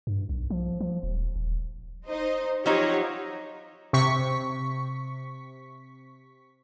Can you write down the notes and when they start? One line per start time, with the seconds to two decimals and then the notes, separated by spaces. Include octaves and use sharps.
0.07 G2
0.29 B1
0.50 F3
0.81 F3
1.03 D#1
1.36 D#1
2.07 D#4 C5 D#5
2.66 F3 F#3 D#4 G4 C#5 F#5
3.93 C3 C#6 B6